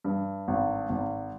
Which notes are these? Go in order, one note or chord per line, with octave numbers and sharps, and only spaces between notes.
G2
G#1
G#1